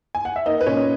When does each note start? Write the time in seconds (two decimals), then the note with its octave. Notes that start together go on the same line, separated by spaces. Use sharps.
0.15 G#5
0.25 F#5
0.36 E5
0.46 A#3 D#4 D#5
0.61 B4
0.66 A#2 C#4 C#5